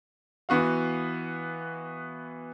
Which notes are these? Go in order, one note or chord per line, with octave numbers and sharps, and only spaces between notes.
E3 B3 F#4 F5